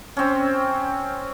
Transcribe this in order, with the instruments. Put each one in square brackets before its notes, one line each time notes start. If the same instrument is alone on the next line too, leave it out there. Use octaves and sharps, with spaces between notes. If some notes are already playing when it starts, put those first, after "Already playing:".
[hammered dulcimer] C4 C#4